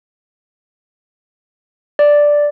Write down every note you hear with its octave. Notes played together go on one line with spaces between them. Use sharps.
D5